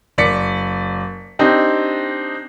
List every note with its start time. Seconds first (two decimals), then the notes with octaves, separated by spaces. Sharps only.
0.18 F#1 D5 B6 C#7
1.39 C4 D4 D#4 G4